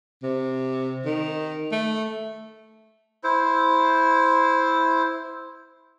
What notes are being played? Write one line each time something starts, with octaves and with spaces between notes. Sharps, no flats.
C3
D#3
A3
E4 C5